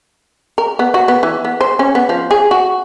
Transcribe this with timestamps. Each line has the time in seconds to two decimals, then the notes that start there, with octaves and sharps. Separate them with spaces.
0.58 A#4
0.79 B3
0.94 F#4
1.08 B3
1.23 E3
1.45 B3
1.61 C5
1.79 C#4
1.95 B3
2.09 F3
2.31 G#4
2.51 F#4